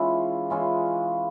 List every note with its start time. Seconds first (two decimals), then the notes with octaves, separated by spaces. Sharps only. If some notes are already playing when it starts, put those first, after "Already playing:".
Already playing: E3 G#3 C#4 F4
0.50 E3 G#3 C#4 F4